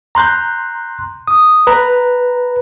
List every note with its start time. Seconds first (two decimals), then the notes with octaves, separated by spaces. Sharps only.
0.15 A#5 C6 F#6 G6
1.27 D#6
1.67 B4 A#5